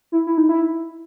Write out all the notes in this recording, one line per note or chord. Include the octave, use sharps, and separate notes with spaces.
E4
E4
D#4
E4